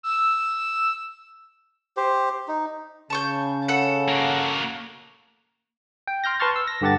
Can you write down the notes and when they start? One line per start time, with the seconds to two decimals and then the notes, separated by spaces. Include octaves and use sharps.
0.03 E6
1.97 G4 C5
2.48 D#4
3.10 C#3 A5 C#6 G6
3.68 A4 F#5
4.08 A#3 F#4
6.07 G5
6.24 C6 F6 G6 A#6
6.40 B4 A5 C6 C#6 F6 A6
6.56 E6
6.68 A#6
6.81 G2 D3 G4 F#5 A5 A6